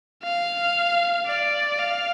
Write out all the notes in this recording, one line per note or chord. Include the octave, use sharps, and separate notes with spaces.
F5
D5
F5